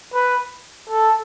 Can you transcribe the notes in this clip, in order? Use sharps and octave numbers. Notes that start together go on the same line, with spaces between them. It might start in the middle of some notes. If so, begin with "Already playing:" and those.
B4
A4